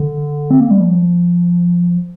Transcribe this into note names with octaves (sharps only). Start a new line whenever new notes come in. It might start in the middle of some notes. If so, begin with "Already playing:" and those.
Already playing: D3
C4
A#3
G3
F3